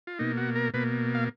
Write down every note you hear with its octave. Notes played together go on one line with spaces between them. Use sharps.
F4
B2 A#3 D#4
F#4
A#4
B2 A#3 B4
F5